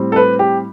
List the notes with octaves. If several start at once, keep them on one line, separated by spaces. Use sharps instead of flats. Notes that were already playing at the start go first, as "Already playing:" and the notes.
Already playing: A2 G3 C4
A4
B4
G4